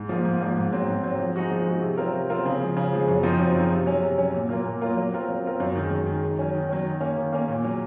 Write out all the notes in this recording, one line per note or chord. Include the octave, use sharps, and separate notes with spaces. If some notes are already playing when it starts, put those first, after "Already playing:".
Already playing: G#2
F3 A#3
G#2
F3 A#3
G#2
F#3 C4
G#2
F#3 C4
F3
G#3 D#4 F#4
F3
G#3 D#4 F#4
C3
F#3 C4 F4 A#4
C3
F#3 C4 F4 A#4
C#3
F3 G#3
C#3
F3 G#3
F#2
F3 C4 D#4
F#2
F3 C4 D#4
C3
F#3 C#4
C3
F#3 C#4
A#2
F#3 A#3 F4 A#4
A#2
F#3 A#3 F4 A#4
F#3
C4 F4 A#4
F#3
C4 F4 A#4
F#2
D#3 G#3
F#2
D#3 G#3
D#3
F#3 C#4
D#3
F#3 C#4
D#3
A#3 C#4
D#3
A#3 C#4
A#2
F#3 C#4